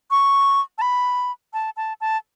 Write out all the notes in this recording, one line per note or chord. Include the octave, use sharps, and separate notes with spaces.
C#6
A5
B5
A5
A5
A5